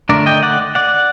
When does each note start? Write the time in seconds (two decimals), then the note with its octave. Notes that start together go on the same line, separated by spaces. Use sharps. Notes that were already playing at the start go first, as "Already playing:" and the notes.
0.09 D3 A3 D4 A#4 D5
0.26 D#5 G5
0.43 D5 F#5
0.75 D5 F#5